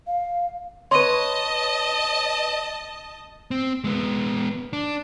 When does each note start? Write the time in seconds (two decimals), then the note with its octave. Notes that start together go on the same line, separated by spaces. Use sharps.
0.07 F5
0.91 B4 C#5 D#5 A5 C6 D#7
3.51 C4
3.84 G#3 B3
4.73 D4